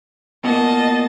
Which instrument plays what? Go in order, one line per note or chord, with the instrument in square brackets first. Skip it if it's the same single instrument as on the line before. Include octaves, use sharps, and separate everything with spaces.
[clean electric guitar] B2 A#3 [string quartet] D#5 A5